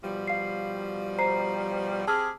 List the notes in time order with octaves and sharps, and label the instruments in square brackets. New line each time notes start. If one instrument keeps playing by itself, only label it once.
[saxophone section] B2 F3 G3
[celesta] F5 C7
C5 A#5 C7
[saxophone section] C4 G4 G#4 [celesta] A5 E6 F6